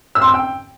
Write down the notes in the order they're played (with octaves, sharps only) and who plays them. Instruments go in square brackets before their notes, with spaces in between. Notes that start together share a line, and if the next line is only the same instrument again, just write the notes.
[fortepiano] E6
C6
E6
G5